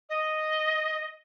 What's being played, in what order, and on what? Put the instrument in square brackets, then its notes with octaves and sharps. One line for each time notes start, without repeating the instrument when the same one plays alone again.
[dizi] D#5